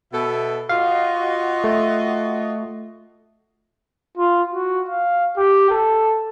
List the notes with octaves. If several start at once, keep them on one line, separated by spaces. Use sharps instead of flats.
B2 A4 E5
F4 F#4 D#5 F5
A3
F4
F#4
F5
G4
A4